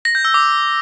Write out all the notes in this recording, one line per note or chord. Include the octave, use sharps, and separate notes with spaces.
A#6
G6
E6
D6